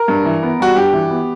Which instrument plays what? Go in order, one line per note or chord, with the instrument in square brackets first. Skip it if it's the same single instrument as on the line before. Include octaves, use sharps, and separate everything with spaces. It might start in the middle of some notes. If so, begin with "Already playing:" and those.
Already playing: [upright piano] A#4
G2
E3
B3
G3 F#4
G2 G4
E3
B3